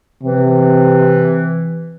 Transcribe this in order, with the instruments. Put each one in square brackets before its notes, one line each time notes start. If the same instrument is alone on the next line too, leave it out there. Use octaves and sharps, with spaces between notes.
[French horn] C3 [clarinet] E3